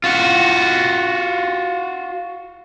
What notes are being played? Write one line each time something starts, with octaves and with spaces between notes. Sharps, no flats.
F4 F#4